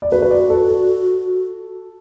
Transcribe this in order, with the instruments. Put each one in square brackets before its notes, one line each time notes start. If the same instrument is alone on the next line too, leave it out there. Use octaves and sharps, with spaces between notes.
[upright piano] D5
[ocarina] F#4 [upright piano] B4
[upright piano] B4
D5
A4
A4